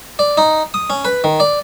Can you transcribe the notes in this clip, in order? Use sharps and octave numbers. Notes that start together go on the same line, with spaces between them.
D5
D#4
D#6
C#4
B4
D#3
D5